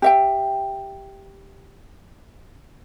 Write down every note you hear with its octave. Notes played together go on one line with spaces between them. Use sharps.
G4 E5 G5